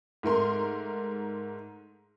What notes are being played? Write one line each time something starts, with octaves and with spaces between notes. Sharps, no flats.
G#2 A3 A#4 C6